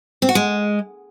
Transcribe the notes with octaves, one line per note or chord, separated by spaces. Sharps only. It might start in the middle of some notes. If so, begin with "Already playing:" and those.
C4
F#4
G#3